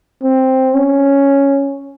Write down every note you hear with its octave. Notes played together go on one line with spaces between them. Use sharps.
C4
C#4